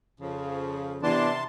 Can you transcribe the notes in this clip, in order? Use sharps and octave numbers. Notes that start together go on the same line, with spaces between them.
F2 C#3 F3
C3 E3 B3 D4 A5 C6